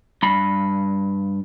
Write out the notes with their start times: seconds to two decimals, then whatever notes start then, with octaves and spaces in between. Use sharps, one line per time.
0.23 G2 B5